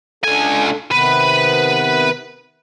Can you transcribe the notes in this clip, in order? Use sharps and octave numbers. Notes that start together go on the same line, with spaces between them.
C#2 D4 A4 G#5
C3 D#3 B3 B4